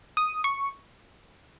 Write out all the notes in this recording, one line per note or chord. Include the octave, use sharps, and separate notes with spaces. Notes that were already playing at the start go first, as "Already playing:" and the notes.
D#6
C#6